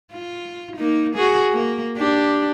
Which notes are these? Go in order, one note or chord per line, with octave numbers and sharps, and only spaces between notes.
F4
A#3 D#4
F#4 G#4
A#3
D4 G4